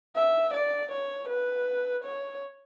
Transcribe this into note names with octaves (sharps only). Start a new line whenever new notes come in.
E5
D5
C#5
B4
C#5